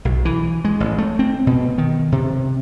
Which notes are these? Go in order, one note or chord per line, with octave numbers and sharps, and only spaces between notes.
B1
E3
G#3
A1
A3
C4
B2
D#3
C3